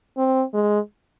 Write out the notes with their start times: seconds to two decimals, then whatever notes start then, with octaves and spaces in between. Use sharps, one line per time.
0.17 C4
0.54 G#3